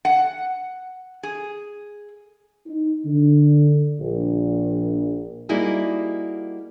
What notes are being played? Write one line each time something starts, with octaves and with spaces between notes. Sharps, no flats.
F#5
G#4
D#4
D3
A#1
G3 A#3 D#4 E4 F#4 G#4